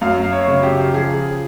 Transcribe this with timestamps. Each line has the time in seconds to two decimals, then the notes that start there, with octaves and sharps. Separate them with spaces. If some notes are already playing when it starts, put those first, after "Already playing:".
0.01 F#2 F5
0.33 C#5
0.48 C#3
0.63 G4
0.94 F3 G#4